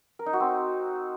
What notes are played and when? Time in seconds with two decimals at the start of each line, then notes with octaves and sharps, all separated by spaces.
0.19 A#4
0.26 D#4
0.33 F#4
0.40 C4